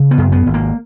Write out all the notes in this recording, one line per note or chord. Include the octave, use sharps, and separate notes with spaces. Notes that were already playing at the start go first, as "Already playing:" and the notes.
Already playing: C#3
B3
F#2
B3
G#1
A#3